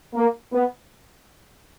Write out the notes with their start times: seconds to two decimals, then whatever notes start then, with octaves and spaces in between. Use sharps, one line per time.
0.14 A#3
0.52 B3